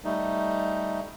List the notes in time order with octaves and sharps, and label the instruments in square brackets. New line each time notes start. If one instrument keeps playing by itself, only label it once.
[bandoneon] G3 A3 D#4